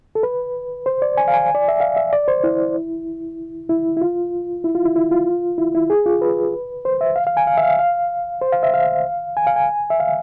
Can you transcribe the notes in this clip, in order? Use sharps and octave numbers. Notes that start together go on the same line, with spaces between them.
A4
B4
C5
D5
G#5
F5
G#5
D5
E5
F5
E5
D5
C5
E4
E4
E4
F4
E4
F4
E4
E4
F4
E4
E4
G#4
F4
B4
C5
E5
F5
F5
G#5
F5
E5
F5
F5
C5
F5
E5
F5
G#5
F5
G#5
E5
F5